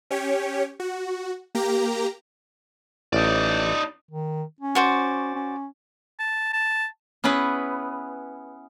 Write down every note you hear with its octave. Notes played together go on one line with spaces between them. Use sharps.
C#4 G4 C#5
F#4
A#3 G4 A#5
A1 D#4 D5
D#3
C#4
F#4 C5 D5
C#4
A5
A5
B3 C#4 E4 G#4 B4